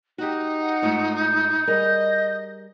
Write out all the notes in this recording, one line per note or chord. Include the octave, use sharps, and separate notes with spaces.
D#4 F#4 G4
F#5
G#2 A3 F4
G6
G3 G#4 A#4 D#5